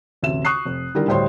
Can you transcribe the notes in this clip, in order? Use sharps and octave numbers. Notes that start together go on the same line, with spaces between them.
A1 D2 C3 E5 E7
C#6 D#6 F#6 C7
F1
D3 D#3 G3 E4 G4 A#4
D2 A2 G3 C5 C#5 C6